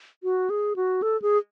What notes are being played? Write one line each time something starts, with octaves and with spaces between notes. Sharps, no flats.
F#4
G#4
F#4
A4
G#4